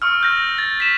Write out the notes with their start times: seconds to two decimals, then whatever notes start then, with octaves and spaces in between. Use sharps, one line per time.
0.02 C#6 E6 F6
0.21 F6 G6 A#6
0.58 A6
0.80 B6 E7